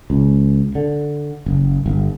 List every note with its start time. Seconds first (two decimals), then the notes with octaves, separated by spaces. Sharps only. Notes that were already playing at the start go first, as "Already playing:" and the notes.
0.10 C#2
0.75 D3
1.46 F#1
1.86 G1